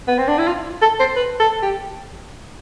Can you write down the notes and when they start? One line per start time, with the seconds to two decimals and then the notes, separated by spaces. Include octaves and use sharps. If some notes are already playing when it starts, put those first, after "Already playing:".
0.08 B3
0.18 C4
0.28 D4
0.38 E4
0.47 F4
0.82 A4
1.00 C5
1.16 B4
1.40 A4
1.62 G4